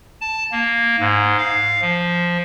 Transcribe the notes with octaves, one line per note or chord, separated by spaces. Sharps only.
A5
A#3
G#2
F5
F3